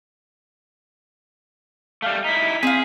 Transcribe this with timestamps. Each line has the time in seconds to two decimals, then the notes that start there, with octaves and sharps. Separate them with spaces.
2.02 G3 A3 F5
2.24 D#4 E4 B6
2.63 C4 G#4 F5